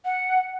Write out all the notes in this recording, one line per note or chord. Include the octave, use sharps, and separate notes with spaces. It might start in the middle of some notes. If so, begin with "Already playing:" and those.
F#5